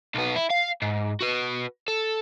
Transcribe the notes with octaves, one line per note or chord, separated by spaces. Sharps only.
B1 B3
E4
F5
G#2
F#4 B4
A4